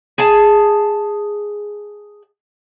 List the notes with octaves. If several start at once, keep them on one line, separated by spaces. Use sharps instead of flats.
G#4 A5